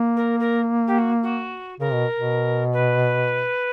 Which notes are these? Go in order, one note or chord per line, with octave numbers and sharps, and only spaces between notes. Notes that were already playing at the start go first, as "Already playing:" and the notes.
Already playing: A#3
A#4
A#4
G4
F#4
F#4
C#3 A#4
B2
B2
B4